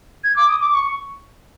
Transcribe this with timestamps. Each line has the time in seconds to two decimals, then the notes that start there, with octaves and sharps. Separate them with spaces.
0.24 G#6
0.36 D6
0.48 D#6
0.60 D6
0.72 C#6